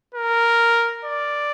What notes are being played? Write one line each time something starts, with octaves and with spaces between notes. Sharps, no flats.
A#4
D5